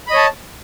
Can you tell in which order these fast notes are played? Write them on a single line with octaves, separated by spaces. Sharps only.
B5 D#5 C#5 A5